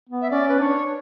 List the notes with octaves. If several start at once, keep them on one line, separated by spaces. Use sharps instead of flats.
B3
E5
C#4 D5
B4
D4 C#5 D5